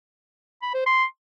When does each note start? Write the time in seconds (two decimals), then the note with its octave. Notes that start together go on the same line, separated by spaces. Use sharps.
0.62 B5
0.74 C5
0.86 C6